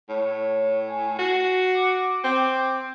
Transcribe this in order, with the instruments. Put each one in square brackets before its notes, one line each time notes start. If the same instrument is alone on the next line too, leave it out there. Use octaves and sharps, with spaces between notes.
[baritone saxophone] A2 [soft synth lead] C#5
[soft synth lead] G#5
[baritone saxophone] F#4 [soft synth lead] C7
[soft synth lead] D6
[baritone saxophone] C4